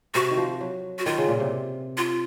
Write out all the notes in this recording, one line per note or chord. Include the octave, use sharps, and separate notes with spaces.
C3 F#4
D#3
F3
F#3
F#4
D#3 F4
C#3
A#2
C3
F4